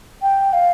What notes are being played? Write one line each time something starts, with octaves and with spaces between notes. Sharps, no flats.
G5
F5